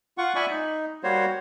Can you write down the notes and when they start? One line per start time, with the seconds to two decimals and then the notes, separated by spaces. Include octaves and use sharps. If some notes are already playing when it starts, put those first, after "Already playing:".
0.18 F4 F#5 C#6
0.35 D5 E5 G#5 B5 C#6
0.50 D#4
1.03 G3 A#3 F#4 C5 C#5